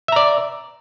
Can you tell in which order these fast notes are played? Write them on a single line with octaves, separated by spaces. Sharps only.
E5 A#5 D5